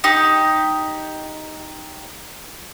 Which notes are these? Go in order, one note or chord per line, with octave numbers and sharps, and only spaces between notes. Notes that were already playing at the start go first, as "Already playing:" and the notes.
D#4 G4